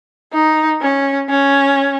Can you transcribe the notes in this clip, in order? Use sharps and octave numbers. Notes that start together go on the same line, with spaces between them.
D#4
C#4
C#4